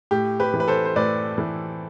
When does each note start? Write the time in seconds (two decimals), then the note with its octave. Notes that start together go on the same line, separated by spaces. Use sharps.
0.11 A2 G4
0.40 G4 B4
0.54 E3
0.60 B4
0.68 A4 C5
0.85 C5
0.96 A2 B4 D5
1.38 E3